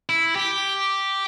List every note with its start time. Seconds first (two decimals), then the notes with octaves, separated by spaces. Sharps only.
0.09 E4
0.36 G4